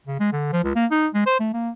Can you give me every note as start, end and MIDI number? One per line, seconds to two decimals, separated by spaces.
0.07 0.19 49
0.20 0.30 56
0.33 0.51 50
0.52 0.64 53
0.64 0.74 37
0.75 0.86 58
0.91 1.07 63
1.14 1.22 56
1.26 1.38 72
1.40 1.49 57
1.53 1.70 58